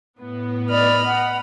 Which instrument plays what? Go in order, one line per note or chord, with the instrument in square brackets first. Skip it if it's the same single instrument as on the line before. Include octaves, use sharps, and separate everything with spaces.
[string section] A2 B3
[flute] D5 [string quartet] D#5 B5 F6
[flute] F#5